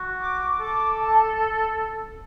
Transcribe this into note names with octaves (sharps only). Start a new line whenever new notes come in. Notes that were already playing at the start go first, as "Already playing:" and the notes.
Already playing: F#4
D6
A4 D6
A5